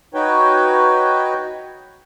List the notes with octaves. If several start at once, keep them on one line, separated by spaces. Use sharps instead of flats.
D#4 F#4 B4 C#5 G5